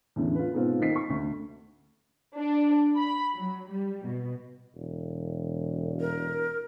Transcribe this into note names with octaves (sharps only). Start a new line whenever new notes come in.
E2 A2 D3 C#4
F4 B4
G#2 B2 B3 C4 F4
D#3 A#3 C4 D#5 B6 C7
C#6
D2
D4
B5
F#3
G3
B2
E1
A#4